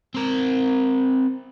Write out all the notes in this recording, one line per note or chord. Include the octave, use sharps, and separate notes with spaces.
C4 A#4